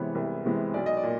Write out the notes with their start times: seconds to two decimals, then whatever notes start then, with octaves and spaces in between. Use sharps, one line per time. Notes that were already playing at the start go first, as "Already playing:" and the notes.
Already playing: C2 C3 E3 G#3 B3 C#5
0.15 C2
0.45 C3 E3 G#3 B3
0.74 B1 D5
0.86 D#5
0.97 D5
1.03 A#2